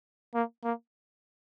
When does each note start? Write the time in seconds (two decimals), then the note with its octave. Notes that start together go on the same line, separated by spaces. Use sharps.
0.34 A#3
0.64 A#3